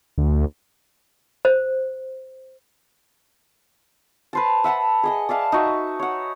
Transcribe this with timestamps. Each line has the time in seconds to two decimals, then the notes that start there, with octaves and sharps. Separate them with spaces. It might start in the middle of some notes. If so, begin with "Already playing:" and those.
0.18 D2
1.45 C5
4.33 B4 C5 A5
4.64 E5 F#5 A5 B5
5.03 G#4 D#5 G#5
5.29 D5 E5 F5 A5
5.52 D#4 F#4 E5
5.99 C#5 F#5